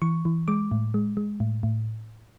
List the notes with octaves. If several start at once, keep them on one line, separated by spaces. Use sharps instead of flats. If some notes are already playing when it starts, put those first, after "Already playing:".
E3 C#6
E3
G#3 D6
A2
G#3
G#3
A2
A2